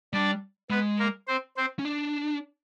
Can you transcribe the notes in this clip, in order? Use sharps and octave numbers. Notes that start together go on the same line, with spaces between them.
G3 D4 D5
G#3 B3 B4
A#3 A#4
C4 C5
C4 C5
C#4
D4